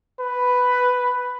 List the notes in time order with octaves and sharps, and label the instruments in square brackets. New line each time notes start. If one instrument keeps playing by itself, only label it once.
[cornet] B4